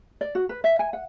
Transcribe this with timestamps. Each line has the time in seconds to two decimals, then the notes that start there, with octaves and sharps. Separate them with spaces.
0.21 D5
0.35 F#4
0.49 B4
0.64 E5
0.79 G#5
0.93 F#5